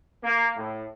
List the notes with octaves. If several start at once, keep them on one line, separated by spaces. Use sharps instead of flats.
A#3
A2